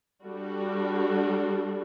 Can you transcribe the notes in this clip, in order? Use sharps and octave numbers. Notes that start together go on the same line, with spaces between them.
G3 D4 F#4 A4